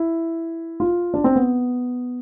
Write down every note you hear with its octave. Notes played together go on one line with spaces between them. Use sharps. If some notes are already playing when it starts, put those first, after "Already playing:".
Already playing: E4
F4
D4
C4
B3